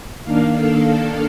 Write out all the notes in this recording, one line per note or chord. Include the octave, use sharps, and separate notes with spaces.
D#3 A#3 D4 F5
A4
A4